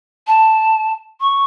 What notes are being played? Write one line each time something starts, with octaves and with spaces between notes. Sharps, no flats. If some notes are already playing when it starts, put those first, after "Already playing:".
A5
C#6